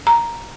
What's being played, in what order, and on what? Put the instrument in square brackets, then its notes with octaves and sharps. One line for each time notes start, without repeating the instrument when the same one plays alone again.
[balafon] A#5